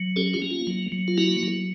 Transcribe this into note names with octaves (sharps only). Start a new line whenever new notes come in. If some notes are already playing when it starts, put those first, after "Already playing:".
Already playing: F#3
C#4 G4 A4
F4 G4
A#3
F4
F#3
F#3
F4
A#3 E4 F#4
F#3